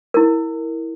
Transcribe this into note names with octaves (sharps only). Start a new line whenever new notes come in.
E4 A#4